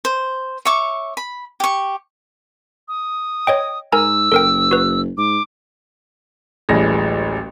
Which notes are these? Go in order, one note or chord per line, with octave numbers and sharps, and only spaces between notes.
C5
C#5 E5 C#6 D6
B5
G4 C#6
D#6
C#5 D#5 G5
G#2 A#4 G#5 A#5 E6
F#1 A4 A#4 G5
F#4 B4
G#2 D6
D1 A1 E3 G3 G#3 A#6